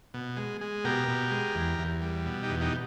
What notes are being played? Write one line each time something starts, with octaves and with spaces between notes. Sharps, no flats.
B2
G#3
G#3
B2 G4 A#4
B2
G#3
E2
E2
G3
B2
D#4 G4
E2
D#4 G4